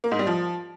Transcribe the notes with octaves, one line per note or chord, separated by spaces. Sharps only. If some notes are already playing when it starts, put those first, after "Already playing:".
A#3
G#2
G3
F3